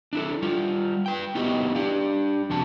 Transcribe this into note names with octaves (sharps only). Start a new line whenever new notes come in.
D4 E4 A4
G3 F4
B4 G5
B3 D#4 E4 F#4 G4 D#5
D4 G4
F2 C3 F#4 A5